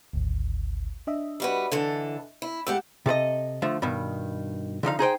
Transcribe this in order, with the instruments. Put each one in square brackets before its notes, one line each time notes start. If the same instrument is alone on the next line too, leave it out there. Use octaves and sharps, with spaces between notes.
[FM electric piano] G#1 D2
D4 D#5 E5
[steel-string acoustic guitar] G3 F#4 B4
D3 E3 A4
E4
[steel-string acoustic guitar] A2 G4 F#5 [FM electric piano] G#3 E6
[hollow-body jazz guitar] C3 A4 B4 D#5
D3 F3 A3
G2 B2 D#3
D3 F3 D#4 F5
D#4 G#4 C5 G5